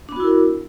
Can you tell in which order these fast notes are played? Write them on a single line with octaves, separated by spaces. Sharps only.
D4 B3 F#4 E4 A#4